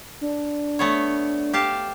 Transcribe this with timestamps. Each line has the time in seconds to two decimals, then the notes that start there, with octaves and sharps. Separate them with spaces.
0.21 D4
0.79 A3 B3 C#5
1.53 G4 F5 A5